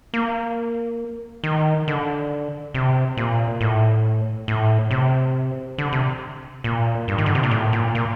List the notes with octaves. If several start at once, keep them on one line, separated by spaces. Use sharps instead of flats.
A#3
D#3
D3
C3
A#2
A2
A2
C3
D3
C3
A#2
G2
D#3
D3
C3
A#2
A2
A#2
A#2